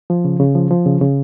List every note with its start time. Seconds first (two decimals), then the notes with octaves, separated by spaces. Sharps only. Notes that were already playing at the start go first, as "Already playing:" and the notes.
0.10 F3
0.25 C#3
0.40 C#3
0.55 F3
0.71 F3
0.86 C#3
1.01 C#3